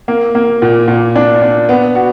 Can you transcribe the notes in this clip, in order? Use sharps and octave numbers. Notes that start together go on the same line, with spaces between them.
A#3
A#3
A#2
A#2
D4
D4
B3
F#4